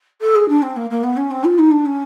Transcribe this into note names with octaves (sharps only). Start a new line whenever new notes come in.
A4
G#4
D4
C4
A#3
A#3
B3
C#4
C4
F4
D#4
D4
C#4